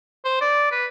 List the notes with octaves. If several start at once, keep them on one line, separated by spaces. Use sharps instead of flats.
C5
D5
B4